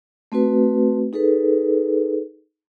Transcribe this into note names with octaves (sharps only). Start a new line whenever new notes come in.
A3 C4 F#4 B4
D#4 G#4 A4 B4